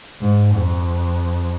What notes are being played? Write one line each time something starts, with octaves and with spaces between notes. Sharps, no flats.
G#2
F2